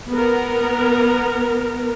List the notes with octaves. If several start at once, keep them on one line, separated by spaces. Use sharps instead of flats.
B3 A#4